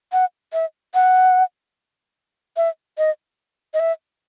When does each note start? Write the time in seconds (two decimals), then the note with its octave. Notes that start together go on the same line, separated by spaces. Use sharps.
0.12 F#5
0.53 E5
0.94 F#5
2.57 E5
2.98 D#5
3.74 D#5
3.79 E5